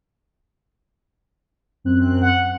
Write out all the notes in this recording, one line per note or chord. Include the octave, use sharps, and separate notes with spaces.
F#2 C4 F#6
F#5